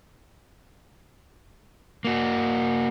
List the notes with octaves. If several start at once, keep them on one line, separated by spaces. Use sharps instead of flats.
A#3 F#4